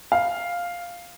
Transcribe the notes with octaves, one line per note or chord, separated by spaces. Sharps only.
F5